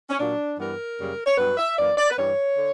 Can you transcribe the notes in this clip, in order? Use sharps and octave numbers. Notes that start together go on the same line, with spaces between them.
C#4
A#2 F#3 A#3 D4
G2 E3 G3 B3 A#4
F#2 C#3 G3 A#3
C#5
G2 F#3 B3 B4
E5
F#2 E3 A#3 D5
D5
B4
G2 E3 G3 C#5
D3